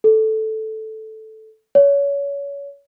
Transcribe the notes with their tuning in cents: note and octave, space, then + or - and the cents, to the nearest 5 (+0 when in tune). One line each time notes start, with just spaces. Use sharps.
A4 -5
C#5 +25